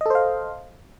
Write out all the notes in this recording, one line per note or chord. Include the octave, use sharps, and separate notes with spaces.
A4 C5 D#5 F5